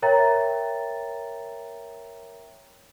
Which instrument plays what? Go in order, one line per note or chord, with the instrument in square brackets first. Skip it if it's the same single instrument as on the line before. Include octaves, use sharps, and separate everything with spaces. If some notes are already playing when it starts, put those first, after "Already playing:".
[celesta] A#4 C#5 E5 G5 A#5 A6